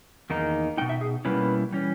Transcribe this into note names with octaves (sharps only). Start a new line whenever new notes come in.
E2 D#3 A#3 D#4
B2 A#3 D#4 G5
E5
G#4
B2 G3 A#3 C#4 E4 B4
E3 G3 C#4